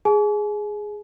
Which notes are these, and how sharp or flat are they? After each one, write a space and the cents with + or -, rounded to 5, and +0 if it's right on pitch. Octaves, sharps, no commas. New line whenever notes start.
G#4 +0 G#5 +40